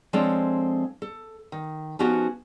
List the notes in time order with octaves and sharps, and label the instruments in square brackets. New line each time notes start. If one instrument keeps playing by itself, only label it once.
[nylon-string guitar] F3 G#3 C4 D4 A4 C#5
A4
D#3
F3 B3 C#4 D#4 F#4 G4